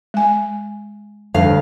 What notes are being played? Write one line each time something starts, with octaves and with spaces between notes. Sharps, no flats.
G#3 G#5
D2 G2 F5